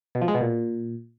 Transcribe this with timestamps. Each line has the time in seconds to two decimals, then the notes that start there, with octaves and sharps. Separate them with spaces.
0.15 B2
0.22 F3
0.28 G#3
0.35 B2
0.41 A#2